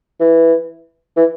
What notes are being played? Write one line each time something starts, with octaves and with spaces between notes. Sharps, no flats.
E3
E3